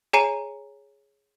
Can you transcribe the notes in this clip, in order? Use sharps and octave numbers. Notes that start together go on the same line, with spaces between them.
G#4 C#5 G#5 A#5 C7 D#7